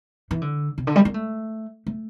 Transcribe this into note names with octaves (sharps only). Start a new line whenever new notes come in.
E3
D3
C3
D3
G3
A#3
A3
A3